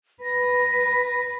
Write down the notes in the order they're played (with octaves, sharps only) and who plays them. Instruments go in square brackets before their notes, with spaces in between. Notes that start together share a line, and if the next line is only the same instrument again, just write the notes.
[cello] B4 [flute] A#6